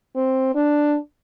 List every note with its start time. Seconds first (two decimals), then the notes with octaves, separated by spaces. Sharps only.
0.16 C4
0.55 D4